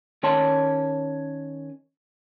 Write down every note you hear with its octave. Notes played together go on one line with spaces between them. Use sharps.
D#3 C#4 C#5 A5 C6